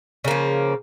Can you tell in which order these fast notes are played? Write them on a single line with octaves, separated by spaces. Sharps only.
C#3 A#3 F3